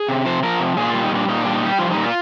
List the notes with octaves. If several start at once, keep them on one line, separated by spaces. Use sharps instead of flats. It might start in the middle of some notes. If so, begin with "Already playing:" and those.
Already playing: G#4
C3
F3 C5
F3 A#4
C3
A#2 G#4
G3 F4
D#4
A#2 D4
A#2 D#4
G3 D4
D#4
G3 G4
F3 F4
D#4
A#2
F4